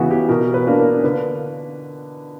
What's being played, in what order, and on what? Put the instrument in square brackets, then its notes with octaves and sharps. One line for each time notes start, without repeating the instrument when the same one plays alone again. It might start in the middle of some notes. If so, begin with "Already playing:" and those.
Already playing: [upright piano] C#3 E3 B3 F#4 B4
G4
B2 A#4
B4
A#3 D4
A#4
D3 B4